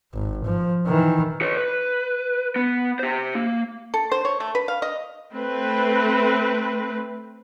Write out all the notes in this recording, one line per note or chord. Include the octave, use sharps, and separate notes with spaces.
G#1
F3
D#3 E3
B4 C#5
B4
B3
G4 C5
A#3
A4
C5
C#5
A3
B4
F5
D#5
A3 C4 B4